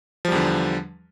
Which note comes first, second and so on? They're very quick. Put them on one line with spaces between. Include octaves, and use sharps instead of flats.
F3 G3 E2 D3